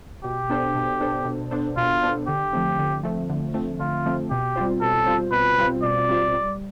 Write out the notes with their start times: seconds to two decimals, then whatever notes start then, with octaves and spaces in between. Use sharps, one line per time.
0.24 B2 G4
0.50 B3 D4 A4 C5
0.75 B2
1.01 B3 D4 A4 C5
1.25 B2
1.51 B3 D4 A4 C5
1.77 B2 F4
2.03 B3 D4 A4 C5
2.27 D3 G4
2.53 F3 A3 C4
2.79 D3
3.03 F3 A3 C4
3.29 D3
3.54 F3 A3 C4
3.79 D3 F4
4.06 F3 A3 C4
4.30 B2 G4
4.56 G3 C4 F4 C5
4.81 B2 A4
5.06 G3 C4 F4 C5
5.32 B2 B4
5.58 G3 C4 F4 C5
5.83 B2 D5
6.09 G3 C4 F4 C5
6.34 G3